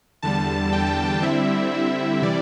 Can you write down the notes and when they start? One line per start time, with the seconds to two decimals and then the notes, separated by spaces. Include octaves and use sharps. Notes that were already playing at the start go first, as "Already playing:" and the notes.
0.22 E2 D3 G3 A5
0.73 E2 D3 G3 G5
1.22 D3 G3 C4 E4 E5
1.73 D3 G3 C4 E4
2.22 C3 E3 G3 E4 D5